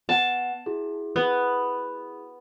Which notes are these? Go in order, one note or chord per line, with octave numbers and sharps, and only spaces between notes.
B3 F#5 A5
E4 F#4 G#4
B3